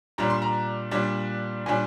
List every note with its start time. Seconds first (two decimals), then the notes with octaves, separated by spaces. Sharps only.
0.18 A#2 G3 D4 A#5
0.30 C6
0.42 A#5
0.91 A#2 G3 D4
1.66 A#2 G3 D4 G#5